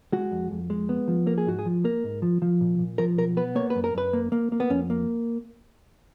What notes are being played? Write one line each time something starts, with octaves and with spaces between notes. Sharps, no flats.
G#3 F#4
F2
F2
G#3
B3
F3
A#3 A#4
G#4
G#2 F#4
G#4
F3
A#3 A#4
G#2
F3
F3
A#2
A#2
F3 A#4
B1 A#4
B3 B4
A#3 C#5
B4
F#2
A#4
F#2 B4
A#3
A#3
A#3
B3
F2 C#4
A#3